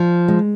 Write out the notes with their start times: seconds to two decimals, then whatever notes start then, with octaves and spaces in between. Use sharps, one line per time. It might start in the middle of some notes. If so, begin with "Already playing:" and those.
Already playing: F3
0.28 G#3